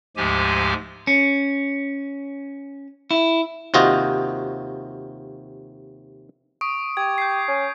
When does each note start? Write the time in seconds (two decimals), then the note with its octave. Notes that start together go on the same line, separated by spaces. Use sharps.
0.17 D2 G#2 F3 G#3 G4 G#5
1.07 C#4
3.11 E4
3.74 D#2 C3 F4 F#4 D#5
6.61 C#6 D#6 D7
6.97 G4 G#6
7.18 G6 C7
7.48 C#4